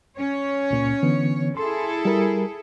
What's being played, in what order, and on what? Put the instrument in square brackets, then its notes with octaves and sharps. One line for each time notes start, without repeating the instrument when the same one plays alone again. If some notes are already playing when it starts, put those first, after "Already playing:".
[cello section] C#4 C#5
[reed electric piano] C#2 A#2
D3 E3 B3
[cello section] E4 G#4 A4 [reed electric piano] C6
[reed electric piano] G3 A#4